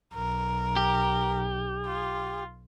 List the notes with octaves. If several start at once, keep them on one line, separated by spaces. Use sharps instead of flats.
B1 A#4
G4
F4